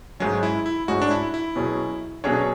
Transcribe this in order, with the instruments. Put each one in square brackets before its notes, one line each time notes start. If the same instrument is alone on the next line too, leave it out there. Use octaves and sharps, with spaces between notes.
[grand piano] G#2 G#3 C#4 [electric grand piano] F#3
[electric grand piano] E4
E4
[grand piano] G#2 G#3 C#4 [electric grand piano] F#4
[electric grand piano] D4
E4
E4
[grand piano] B2 F#3 C#4 G#4 C#5
[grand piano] B2 F#3 C#4 G#4 C#5 [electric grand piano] D4